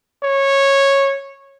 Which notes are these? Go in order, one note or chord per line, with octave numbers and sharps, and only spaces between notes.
C#5